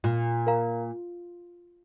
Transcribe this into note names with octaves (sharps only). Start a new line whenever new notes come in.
A#2 F4
A#4 F5 A#5